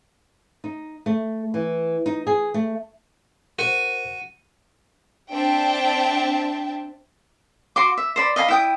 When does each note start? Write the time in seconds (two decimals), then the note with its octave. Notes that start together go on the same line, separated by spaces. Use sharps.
0.64 D#4
1.06 A3
1.54 E3
2.06 D#4
2.27 G#4
2.54 A3
3.59 F#4 A#4 C5 D#7
5.31 C4 D4 E5 G5 A5
7.76 F#4 C6 D6
7.97 E5
8.16 C5 D5 B5
8.36 D#5 F5 G#5 B5
8.48 E4 G5 D#6